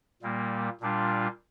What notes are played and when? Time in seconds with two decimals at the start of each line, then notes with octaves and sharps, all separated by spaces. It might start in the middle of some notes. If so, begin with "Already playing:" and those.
0.23 A#2 G3 A#3
0.81 A#2 G3 D4 F4